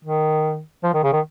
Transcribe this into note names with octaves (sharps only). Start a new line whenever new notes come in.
D#3
F3
D#3
C#3
D#3